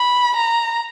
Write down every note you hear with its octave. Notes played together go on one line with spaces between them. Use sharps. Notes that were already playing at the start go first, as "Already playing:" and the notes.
Already playing: B5
A#5